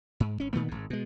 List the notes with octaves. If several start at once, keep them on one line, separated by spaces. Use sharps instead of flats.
G#2
G#1 C#4
A#2 D#3 A3 B3
G#1 G#2
B2 G#3